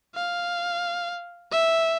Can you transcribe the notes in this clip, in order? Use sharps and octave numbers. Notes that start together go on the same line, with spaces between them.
F5
E5